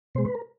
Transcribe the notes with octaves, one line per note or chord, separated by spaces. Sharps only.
B2 G#3 C5
B4
A#4